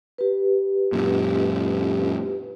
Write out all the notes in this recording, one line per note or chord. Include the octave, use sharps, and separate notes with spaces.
G4 B4
F#2 A#2